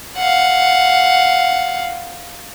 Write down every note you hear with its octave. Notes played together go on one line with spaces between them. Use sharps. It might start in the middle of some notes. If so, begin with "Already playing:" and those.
F5 F#5